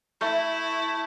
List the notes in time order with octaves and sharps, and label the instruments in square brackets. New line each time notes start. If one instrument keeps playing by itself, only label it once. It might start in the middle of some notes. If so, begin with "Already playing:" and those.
[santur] A3 [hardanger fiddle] E4